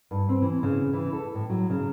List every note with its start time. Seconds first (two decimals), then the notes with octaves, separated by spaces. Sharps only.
0.11 G2
0.29 C4
0.42 E3
0.63 C#3
0.94 E3
1.13 A4
1.35 A2
1.50 F#3
1.70 C#3